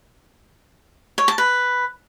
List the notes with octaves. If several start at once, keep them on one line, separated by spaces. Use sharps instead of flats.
C#5
A5
B4